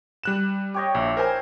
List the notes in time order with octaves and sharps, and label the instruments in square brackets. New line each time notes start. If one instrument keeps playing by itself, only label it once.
[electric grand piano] G3 F#6 E7
[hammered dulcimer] G4 C#5 D#5
[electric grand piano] A#1 [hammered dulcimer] E4
[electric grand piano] A#4 C5 G#5